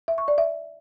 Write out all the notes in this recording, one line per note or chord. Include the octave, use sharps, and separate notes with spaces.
E5
C#6
D5
E5